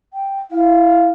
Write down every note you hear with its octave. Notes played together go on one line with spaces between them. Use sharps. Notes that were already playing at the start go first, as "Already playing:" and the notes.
G5
E4 F5